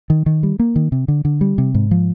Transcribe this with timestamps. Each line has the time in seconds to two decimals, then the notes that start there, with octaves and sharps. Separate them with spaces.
0.10 D#3
0.26 D#3
0.43 G3
0.59 A#3
0.76 D#3
0.92 C3
1.08 D3
1.25 D3
1.41 G3
1.58 C3
1.74 G#2
1.91 F3